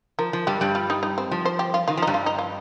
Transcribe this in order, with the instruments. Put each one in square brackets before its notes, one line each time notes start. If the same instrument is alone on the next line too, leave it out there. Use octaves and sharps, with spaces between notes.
[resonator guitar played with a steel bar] F3 [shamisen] A#4
[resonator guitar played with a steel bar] F3
[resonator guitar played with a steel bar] G2 G3 [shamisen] G4
[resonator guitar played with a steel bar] G2 G3
[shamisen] F4
D#4
D#4
C4
[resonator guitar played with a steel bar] F3
[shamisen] C5
G4
F4
[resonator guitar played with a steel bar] D#3 [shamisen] F4
[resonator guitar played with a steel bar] F3
[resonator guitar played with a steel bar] G2 G3 [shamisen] D#4
[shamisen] F4
D#4
F4